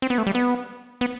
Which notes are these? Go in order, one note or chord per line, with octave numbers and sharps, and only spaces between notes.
C4
B3
A3
G3
B3
B3